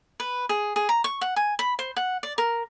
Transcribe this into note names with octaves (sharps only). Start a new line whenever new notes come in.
B4
G#4
G#4
A#5
C#6
F#5
G#5
B5
C5
F#5
D5
A#4